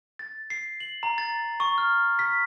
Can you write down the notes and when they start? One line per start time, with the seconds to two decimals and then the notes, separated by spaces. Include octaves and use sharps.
0.19 A6
0.50 C7
0.80 F#7
1.03 A#5
1.18 A6
1.60 C#6
1.78 F6
2.19 B6